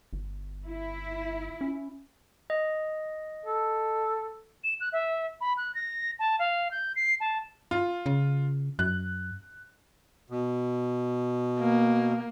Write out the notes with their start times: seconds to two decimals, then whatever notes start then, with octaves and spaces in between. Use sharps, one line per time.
0.13 G1
0.66 E4
1.61 C#4
2.50 D#5
3.46 A4
4.64 E7
4.80 F#6
4.93 E5
5.41 B5
5.57 F#6
5.74 A#6
6.19 A5
6.39 F5
6.71 G6
6.96 C7
7.20 A5
7.71 F4
8.06 C#3
8.79 F#2 F#6
10.30 B2
11.59 A#3